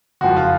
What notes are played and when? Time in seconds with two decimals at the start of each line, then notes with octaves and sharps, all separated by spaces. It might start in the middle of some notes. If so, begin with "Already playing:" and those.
0.21 F#1 F2 F3 F#4
0.37 F4